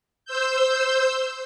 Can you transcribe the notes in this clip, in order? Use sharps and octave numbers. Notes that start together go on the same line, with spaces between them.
C5 E6 G6